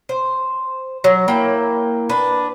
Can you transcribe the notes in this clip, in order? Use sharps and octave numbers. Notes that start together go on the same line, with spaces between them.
C5
F#3
A#3 E4 G5
D4 B4